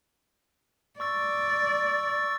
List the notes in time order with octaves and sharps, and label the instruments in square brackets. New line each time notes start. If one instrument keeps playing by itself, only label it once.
[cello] D5 [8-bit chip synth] C#6 E6 A6